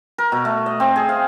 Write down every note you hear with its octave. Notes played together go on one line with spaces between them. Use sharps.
A#4
B2
A3
D#5
C4
G#4
F5